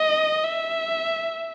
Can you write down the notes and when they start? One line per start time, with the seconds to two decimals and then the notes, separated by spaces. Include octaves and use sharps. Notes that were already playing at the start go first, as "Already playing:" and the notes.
Already playing: D#5
0.44 E5